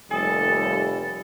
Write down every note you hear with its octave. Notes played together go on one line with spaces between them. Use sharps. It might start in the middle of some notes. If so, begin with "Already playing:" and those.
F1 D#2 C3 G3 A4 G#5 D#6